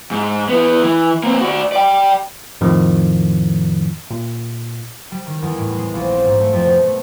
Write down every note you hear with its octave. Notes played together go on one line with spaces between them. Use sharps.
G#2
E3 B3
E3
A#3 C4
F#4 D5
D5 G5
F2 A2 D#3 F3
A#2
G3
D#3
E2
A2
G#3
A#1
C4
G#2
A3
F2
B2
A3